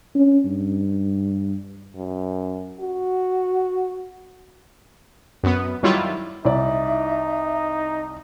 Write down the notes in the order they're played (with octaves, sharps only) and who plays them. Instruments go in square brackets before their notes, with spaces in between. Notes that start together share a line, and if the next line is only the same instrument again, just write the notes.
[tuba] C#4
G2
[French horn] F#2
F#4
[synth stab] F#2 B3
D#3 F#3 G3 E4 F4
[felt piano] C2 E4 D5 [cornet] D#4 [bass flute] E5